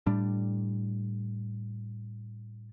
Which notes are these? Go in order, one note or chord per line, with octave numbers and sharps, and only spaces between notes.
A2 G3 D4